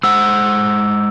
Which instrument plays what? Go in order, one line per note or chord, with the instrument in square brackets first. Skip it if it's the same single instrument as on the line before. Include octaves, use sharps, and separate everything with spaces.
[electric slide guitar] G#3 C5 F#5 [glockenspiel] E6